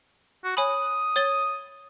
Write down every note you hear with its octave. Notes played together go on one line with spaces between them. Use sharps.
F#4
C#5 G#5 B5 D#6
C#5 A6 G7